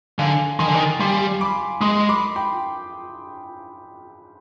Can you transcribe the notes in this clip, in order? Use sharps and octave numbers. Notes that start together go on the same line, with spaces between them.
D3 F5 G#5
D#3 G#5 C6
D3
D#3
G3 G#5 C6
B5 D6
G#3 C6 D#6
B5 D6
G5 B5